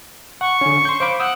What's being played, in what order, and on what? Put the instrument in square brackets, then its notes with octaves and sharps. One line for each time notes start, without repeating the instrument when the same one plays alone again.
[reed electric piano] F#5 [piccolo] C#6
[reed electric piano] D3 C#4
C6 G6
[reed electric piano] C5 F5 B5 [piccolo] D6
[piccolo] F#5 [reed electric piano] D#6 E6 G6